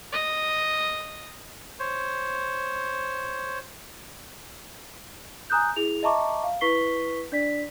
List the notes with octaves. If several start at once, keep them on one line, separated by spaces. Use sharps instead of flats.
D#5
C5 C#5
G#5 A#5 D#6 F#6 G6
E4 G#4 F7
D#5 E5 A5 A#5 C#6 D6
F5
E4 B4 C#6 B6 C7 G7
D4 D5 B6